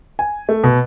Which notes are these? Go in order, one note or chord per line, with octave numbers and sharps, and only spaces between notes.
G#5
A3
B2